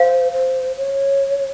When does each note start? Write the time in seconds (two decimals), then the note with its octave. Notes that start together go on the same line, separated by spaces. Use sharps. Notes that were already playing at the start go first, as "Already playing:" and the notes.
Already playing: C5 F5
0.33 C5
0.77 C#5